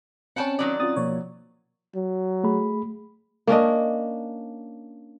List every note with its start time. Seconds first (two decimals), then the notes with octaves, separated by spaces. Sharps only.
0.36 C4 C#4 F#5 G5 A5
0.59 D#3 F#3 D5
0.80 C4 C#4 F4 D#6 A6
0.96 B2 F3 A#3 C#5
1.95 F#3
2.44 A3 G#4 B5
3.47 A#3 C#4 D4 D#5